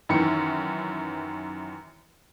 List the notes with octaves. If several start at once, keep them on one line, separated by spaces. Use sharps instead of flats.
F#2 D#3 E3 C#7